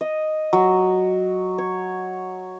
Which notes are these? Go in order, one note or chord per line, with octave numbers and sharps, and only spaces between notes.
D#5
F#3
C#5